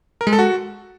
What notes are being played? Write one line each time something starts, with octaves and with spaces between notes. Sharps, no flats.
A#4
G#3
A4
F#4